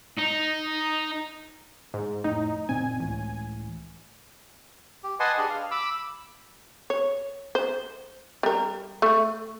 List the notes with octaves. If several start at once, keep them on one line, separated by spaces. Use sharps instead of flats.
D#4
G#2
F1 A2 D#4
F#1 A#2 C4 G#5
C#2 A2 E3
G4
B4 D#5 F#5 G#5 A5 C6
D4 G4 G#4
F5
B5 D6 E6
C#5
C5
G3 A#4
A3